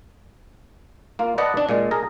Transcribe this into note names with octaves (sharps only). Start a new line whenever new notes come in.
A#3 F4
B4 D5 D#5 F#5 A5
D4
A#2 G#3 D5
G#4 A#4 A#5